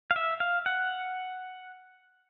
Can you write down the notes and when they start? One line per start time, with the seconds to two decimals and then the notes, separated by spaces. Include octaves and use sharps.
0.11 F5
0.16 E5
0.40 F5
0.66 F#5